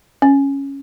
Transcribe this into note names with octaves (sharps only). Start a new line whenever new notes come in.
C#4